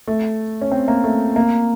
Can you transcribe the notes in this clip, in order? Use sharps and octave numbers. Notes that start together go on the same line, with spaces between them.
A3
C#4
C4
A#3
A3
A#3